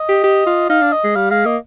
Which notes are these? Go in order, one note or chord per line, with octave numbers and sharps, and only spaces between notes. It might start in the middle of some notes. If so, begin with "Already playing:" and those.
Already playing: D#5
G4
G4
F4
D#4 F5
D4
D#5
G#3
G3 F5
G#3 F5
A#3 D#5